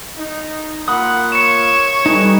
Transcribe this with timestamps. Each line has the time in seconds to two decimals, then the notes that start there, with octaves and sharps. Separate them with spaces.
0.16 D#4
0.88 A#3 F4 F#5 B5 D#6
1.32 C#5 C#7 E7
2.06 G3 D#4 A4 B4 G#5